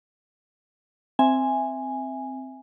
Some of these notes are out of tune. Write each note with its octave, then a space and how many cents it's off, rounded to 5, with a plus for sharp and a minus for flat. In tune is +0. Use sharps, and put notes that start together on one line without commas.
C4 +0 E5 +5 G#5 -5